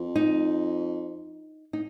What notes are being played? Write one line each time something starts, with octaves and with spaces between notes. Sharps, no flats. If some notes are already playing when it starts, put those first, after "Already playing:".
Already playing: F2
D#4
D#4